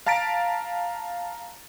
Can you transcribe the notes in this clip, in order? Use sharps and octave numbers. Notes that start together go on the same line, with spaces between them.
F5 A5 A#5 A6 B6 D7